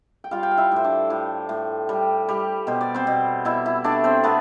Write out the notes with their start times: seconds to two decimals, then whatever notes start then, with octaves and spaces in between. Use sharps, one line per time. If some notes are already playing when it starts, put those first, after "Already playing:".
0.24 G5
0.31 G3 F4 F5
0.43 G5
0.51 F5
0.57 E4 E5
0.72 A2 C5
0.84 D4 D5
1.10 A2
1.49 A2
1.89 G3
2.29 G3
2.67 B2 C5
2.81 D5
2.95 C4 C5
3.07 B2
3.45 B2 E4 E5
3.66 E4 E5
3.84 A3 D4 D5
4.04 C4 C5
4.24 A3 B3 B4